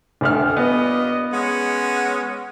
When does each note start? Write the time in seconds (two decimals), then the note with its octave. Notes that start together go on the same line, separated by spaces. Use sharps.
0.21 D#1 D2 F6
0.57 G2 A#2 B3 D#5
1.33 G#3 C#4 F#5